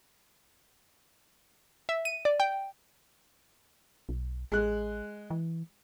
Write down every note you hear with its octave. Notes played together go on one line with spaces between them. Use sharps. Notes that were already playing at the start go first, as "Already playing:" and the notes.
E5
D#7
D5
G5
B1
A1 G#3 F#6
E3